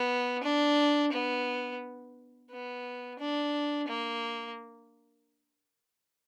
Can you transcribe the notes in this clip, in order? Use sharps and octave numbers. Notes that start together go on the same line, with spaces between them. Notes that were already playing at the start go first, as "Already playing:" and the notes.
Already playing: B3
D4
B3
B3
D4
A#3